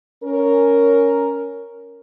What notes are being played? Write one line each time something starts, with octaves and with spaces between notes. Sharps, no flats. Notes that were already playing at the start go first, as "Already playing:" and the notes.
C#4 A#4